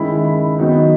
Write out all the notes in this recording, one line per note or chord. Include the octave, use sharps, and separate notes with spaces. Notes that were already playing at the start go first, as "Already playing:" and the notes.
Already playing: D#3 G#3 C#4 E4 B5
B5
D#3 F#3 B3 D#4